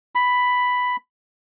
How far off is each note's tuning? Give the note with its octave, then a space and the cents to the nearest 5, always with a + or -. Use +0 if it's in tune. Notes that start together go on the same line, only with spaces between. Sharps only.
B5 +5